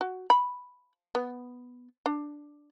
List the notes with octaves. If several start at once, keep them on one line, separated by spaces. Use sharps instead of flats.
F#4
B5
B3
D4